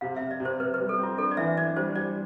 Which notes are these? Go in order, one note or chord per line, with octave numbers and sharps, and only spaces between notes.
C3 F5
C3 E5
D5
C3
C5
C3 B4
B4
G3
A4
C4
F4
D4 A4
D5
E3 E5
D4 D5
G3 C5
G3 D5